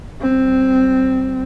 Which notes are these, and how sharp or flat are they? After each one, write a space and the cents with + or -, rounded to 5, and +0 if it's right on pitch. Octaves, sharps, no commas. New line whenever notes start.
G3 -35 C4 +0